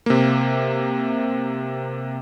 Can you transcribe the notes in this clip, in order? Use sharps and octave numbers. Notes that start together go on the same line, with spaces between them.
C3 A#3